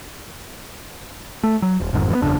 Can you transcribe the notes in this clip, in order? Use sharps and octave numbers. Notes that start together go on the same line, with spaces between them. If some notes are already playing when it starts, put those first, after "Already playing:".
A3
F#3
D#1
G1 F2 G#2 D#3
E3 B3
F#1 E2 C#3 D4